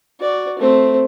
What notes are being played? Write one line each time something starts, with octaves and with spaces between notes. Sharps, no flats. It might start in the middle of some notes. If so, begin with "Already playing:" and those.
F#4 D5
A3 C4